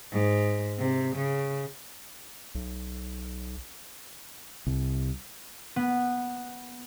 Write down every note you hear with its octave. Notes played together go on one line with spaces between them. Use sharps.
G#2
C3
C#3
B1
C2
B3